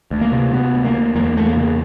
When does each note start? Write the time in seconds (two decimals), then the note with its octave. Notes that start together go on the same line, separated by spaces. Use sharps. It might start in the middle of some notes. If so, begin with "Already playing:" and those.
0.11 D2
0.21 A#3
0.32 C3
0.52 C3 B3
0.74 D2
0.85 A#3
0.94 D2
1.15 E2 A#3
1.36 E2 A3
1.46 A#3
1.56 C#3